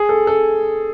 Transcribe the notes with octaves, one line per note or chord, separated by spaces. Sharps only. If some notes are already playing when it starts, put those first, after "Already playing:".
Already playing: G#4
A4
A4